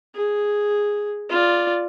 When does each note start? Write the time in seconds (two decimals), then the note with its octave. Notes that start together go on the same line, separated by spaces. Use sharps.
0.15 G#4
1.30 F4 D5